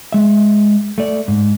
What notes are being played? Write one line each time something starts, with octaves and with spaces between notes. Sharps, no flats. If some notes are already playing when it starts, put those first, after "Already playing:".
G#3 E5
A3 D5
G#2